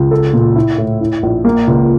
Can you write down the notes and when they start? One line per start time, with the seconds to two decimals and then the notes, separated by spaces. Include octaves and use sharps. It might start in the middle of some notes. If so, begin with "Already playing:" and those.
Already playing: C#2
0.11 A4
0.33 A#2
0.56 E4
0.78 A2
1.00 E4
1.23 A#1
1.45 A#3
1.67 C#2